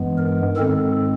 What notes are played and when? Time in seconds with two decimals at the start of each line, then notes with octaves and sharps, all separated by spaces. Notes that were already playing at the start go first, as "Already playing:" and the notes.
Already playing: G2 E3 G#3 B3
0.18 A#4
0.56 G#2 D#3 G#3 C4 A4